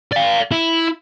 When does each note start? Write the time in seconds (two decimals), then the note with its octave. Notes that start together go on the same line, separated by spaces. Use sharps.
0.13 D5 F5
0.51 E4